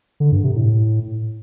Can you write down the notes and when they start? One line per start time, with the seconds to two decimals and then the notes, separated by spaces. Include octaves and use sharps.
0.20 D3
0.32 G2
0.44 C3
0.56 A2